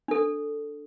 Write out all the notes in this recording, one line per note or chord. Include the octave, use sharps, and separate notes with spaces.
D4 A4